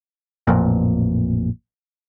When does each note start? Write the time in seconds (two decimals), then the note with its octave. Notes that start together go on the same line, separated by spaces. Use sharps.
0.47 A1 F2 A#2